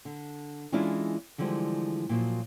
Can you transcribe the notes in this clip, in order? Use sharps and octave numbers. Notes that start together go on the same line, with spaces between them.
D3
E3 G#3 C#4 D4 E4 F4
D3 E3 F3 G3 G#3
A#2 F3 F#3